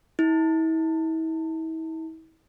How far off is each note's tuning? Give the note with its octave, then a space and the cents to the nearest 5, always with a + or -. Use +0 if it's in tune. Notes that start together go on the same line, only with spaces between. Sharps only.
E4 -40